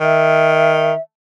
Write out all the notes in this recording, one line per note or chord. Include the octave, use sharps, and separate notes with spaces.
D#3 E5